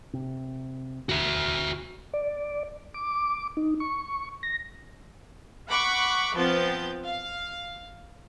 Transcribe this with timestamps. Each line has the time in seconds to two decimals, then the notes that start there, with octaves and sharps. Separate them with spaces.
0.13 C3
1.09 E1 D2 F#4 E5
2.13 D5
2.94 D6
3.57 D#4
3.80 C#6
4.43 A#6
5.69 F#5 B5 C#6 D6 F#6
6.37 F3 B3 C4 G6 A6
7.04 F5